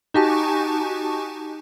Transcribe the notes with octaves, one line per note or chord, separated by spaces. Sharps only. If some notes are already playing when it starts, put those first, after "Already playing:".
D#4 F#4 G4 G#5 A5 C#6